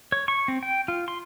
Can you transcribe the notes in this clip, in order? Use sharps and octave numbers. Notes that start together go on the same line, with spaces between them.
C#5
C#6
C4
G5
F4
C6